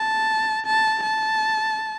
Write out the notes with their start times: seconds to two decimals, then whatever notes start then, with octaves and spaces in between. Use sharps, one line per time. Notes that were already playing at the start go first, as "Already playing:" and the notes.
Already playing: A5
0.66 A5
1.03 A5